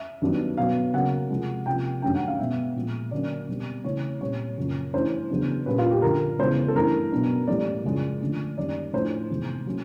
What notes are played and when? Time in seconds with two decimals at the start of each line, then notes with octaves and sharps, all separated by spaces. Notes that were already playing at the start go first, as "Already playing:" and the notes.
Already playing: E5
0.22 G2 D#3 F#3 B3 D4
0.57 B2 F#3 B3 F5
0.93 C#3 F#3 A#3 C#4 F#5
1.31 C3 F3 G#3
1.66 C3 F3 A#3 G5
2.02 G2 D#3 F#3 A3 C#4 G5
2.15 F#5
2.28 F5
2.39 B2 G#3 B3 E5
2.76 A#2 F3 G#3
3.11 D3 F#3 A#3 C#4 D5
3.49 B2 G3 C4
3.84 C#3 E3 A3 C4 C#5
4.21 A#2 G3 C4 C#5
4.57 F#2 C#3 F3 A#3
4.93 G2 E3 A3 C#4 C5
5.31 E2 C#3 F#3 B3 D4
5.66 A#2 G3 A#3 C#4 B4
5.78 F4
5.91 G4
6.02 G2 D3 F3 A#4
6.39 C#3 E3 G#3 B3 C5
6.68 A4
6.75 G2 E3 A3 A#4
7.12 B2 F#3 B3 D4
7.47 A2 E3 G3 A#3 D5
7.84 F#2 C#3 F3 G#3 C#4
8.21 D3 F3 A3 D4
8.57 F#2 D#3 G3 A#3 D5
8.93 A2 F3 A3 D4 C5
9.30 E2 C3 D#3 G#3
9.66 A2 F#3 A#3 C#4